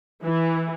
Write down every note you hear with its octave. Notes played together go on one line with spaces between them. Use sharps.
E3